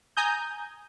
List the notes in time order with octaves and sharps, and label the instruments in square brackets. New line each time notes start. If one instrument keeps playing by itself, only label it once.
[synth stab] G#5 A#5 D#6 G6